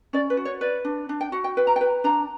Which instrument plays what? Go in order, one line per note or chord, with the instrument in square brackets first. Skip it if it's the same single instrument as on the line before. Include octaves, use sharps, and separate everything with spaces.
[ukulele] C#4 D5
B4
F#4
C#5
B4 D5
D4
D4
G5
F#4 F#5
G5
B4 G5
A#5
G5
B4
D4 A#5